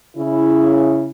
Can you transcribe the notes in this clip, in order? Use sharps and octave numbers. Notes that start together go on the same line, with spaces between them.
C#3 E4